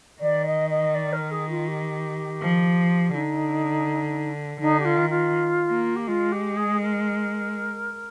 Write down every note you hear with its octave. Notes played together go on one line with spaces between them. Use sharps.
D#3 D5
D#5
D#5
D5
A#4
G#4
F4
G4
F3
D3 D#4
D3 D#4
G4
F4
D#3
F4
A#3
G4
G#3 F4
G4
G#4
A#4